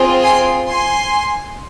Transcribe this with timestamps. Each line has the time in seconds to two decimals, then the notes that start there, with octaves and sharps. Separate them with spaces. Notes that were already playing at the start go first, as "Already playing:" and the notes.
Already playing: C4 F4 G#4
0.23 G#5 C6
0.68 G#5 C6